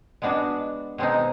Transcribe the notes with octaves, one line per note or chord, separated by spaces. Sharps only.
G#3 B3 D4 F#4
B2 G#3 C4 D#4